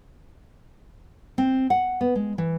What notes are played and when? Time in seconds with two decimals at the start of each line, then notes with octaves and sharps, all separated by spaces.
1.38 C4
1.70 F#5
2.01 B3
2.15 G#3
2.38 E3